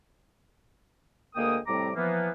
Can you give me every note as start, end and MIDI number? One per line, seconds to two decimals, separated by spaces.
1.35 1.57 38
1.35 1.57 56
1.35 1.57 58
1.35 1.57 70
1.35 1.57 79
1.35 1.57 87
1.67 1.90 45
1.67 1.90 48
1.67 1.90 55
1.67 1.90 60
1.67 1.90 82
1.67 1.90 86
1.96 2.30 52
1.96 2.30 53
1.96 2.30 58
1.96 2.30 59